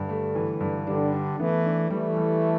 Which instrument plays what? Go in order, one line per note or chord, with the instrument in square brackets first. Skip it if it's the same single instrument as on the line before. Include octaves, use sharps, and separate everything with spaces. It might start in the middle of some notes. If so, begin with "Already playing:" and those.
Already playing: [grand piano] G2 [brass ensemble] D3 G3
[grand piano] A3
E3
G2
[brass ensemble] D3 G3 [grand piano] D4
[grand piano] D4
[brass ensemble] E3 A3 [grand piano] B3
[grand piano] D4
[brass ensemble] E3 A3 [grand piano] G3
[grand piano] G3